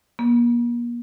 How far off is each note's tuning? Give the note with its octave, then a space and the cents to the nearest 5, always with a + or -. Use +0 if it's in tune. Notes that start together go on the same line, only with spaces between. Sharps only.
A#3 +40